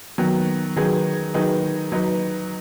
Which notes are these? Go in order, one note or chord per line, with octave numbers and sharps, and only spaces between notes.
D#3 F#3 B3
D#3 F#3 D#4 G#4 B4
D#3 F#3 D#4 G#4 B4
F#3 D#4 B4